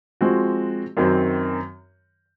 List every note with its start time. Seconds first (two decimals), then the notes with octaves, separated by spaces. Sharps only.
0.21 F3 G#3 C4 F#4
0.97 F#2 D#3 F#3 C4